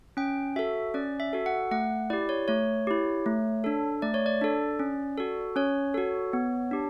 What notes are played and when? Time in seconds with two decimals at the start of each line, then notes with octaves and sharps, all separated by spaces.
0.17 C#4 G5
0.56 F#4 A4 E5
0.94 C#4 D5
1.20 E5
1.33 F#4 A4
1.46 F#5
1.71 A3 F#5
2.10 E4 G4 D5
2.29 C#5
2.48 A3 C#5
2.87 E4 G4
3.26 A3
3.64 D4 A4
4.02 A3 D5
4.14 C#5
4.26 D5
4.41 D4 A4
4.79 C#4
5.18 F#4 A4
5.56 C#4 C#5
5.94 F#4 A4
6.33 B3
6.71 D4 G4